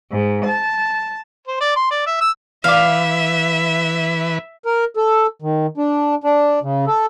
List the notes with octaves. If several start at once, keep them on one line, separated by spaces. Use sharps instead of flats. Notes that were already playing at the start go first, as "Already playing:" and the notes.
G#2
A5
C5
D5
C6
D5
E5
E6
E3 B4 E5 F5 D6 F6
A#4
A4
D#3
D4
D4
C#3
A4